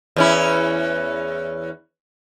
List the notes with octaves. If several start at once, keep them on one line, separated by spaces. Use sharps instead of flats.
E2 C#4 E4